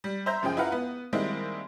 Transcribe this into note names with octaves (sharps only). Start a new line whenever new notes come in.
G3
C5 E5 A#5 G6
F#2 C#3 F3 G#4 G5
E4 F4 B4 F5 F#5 A#5
B3
D#3 G3 G#3 A#3 C4 E4